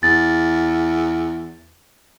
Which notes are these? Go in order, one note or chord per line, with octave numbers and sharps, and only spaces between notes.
E2 A6